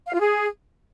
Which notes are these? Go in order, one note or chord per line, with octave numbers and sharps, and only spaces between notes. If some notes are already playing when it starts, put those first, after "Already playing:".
F5
F4
G#4